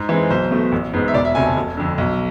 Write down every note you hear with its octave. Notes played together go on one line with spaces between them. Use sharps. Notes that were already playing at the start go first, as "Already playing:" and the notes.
Already playing: G#2
E3 G#3 C4
B1 C5
B2 A3
A1
G#2 G#3 B3
E5
E1 D5
E5
D2 C3 G#5
A5
F1
F2 D3
B1